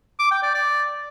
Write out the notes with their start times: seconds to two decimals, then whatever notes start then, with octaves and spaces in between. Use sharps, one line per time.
0.19 D6
0.31 G5
0.43 D5
0.54 D5